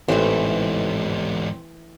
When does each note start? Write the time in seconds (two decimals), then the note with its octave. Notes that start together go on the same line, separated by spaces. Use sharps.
0.08 A1 E2 G#2 E3 A3 C4